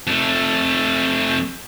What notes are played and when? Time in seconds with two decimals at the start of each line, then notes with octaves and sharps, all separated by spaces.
0.07 F2 A3